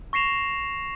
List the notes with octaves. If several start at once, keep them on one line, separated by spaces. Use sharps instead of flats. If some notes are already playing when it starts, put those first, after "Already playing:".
C#6 A#6 C7 E7 F7